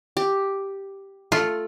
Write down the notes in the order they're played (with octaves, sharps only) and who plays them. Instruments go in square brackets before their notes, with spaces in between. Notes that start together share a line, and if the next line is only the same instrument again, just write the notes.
[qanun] G4
[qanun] A3 [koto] F4